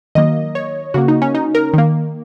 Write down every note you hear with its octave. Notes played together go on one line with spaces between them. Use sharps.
D#3 F#3 A#3 D#5
C#5
C#3 A#3 F#4
D#4
C#4
D#4
A#4
D#3 A#3